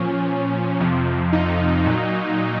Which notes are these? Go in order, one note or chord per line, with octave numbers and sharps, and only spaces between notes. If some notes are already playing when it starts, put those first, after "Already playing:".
Already playing: A#2 F3 C#4
F2 C3 F3
D#4
A#2 F#3